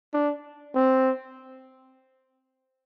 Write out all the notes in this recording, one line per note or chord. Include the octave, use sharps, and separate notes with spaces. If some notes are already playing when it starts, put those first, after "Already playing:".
D4
C4